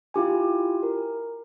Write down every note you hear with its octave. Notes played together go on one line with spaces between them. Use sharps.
E4 F4 G4 G#5
A#4